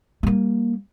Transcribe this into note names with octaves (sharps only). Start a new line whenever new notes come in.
G3 A#3